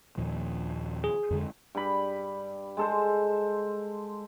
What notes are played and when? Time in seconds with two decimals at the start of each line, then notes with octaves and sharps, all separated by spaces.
0.17 D#2 A#2 F3
1.04 G#4
1.31 F2 D3 G#3
1.75 G2 B5
2.77 G#3 A4 C5